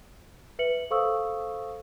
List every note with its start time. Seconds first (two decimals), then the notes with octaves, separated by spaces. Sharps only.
0.59 B4 E5 C#7 F#7
0.91 A4 C5 F5 C#6 D#6 E6